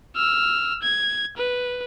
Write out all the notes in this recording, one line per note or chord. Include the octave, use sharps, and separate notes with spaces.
E6 F6
G#6
B4